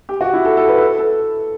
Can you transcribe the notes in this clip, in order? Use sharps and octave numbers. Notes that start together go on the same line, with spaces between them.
G4
F#4
E4
A4
A4
B4
A4
A4